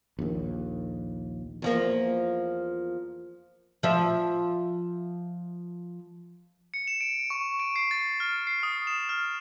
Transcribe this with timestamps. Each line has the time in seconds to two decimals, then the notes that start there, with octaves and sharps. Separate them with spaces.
0.19 A#1 D#2
1.62 E2 F3 A#3
3.83 F3 E5
6.74 C#7
6.87 E7
7.01 D7
7.30 C#6
7.60 D7
7.76 C7
7.91 A6
8.20 F6
8.47 C7
8.63 D#6
8.87 E7
9.09 F6